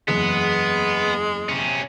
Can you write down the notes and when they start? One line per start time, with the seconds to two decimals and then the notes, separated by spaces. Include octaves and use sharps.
0.08 F#1 E2 G#3 B3 C#7
1.49 C3 C#4